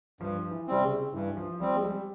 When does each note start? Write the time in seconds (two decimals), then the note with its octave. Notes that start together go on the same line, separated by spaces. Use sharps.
0.21 G2 F3
0.51 E3
0.68 C3 G3 C4
0.83 C#3
1.14 G2 E3
1.37 F3
1.60 F3 G3 C4
1.76 G#3
1.83 G3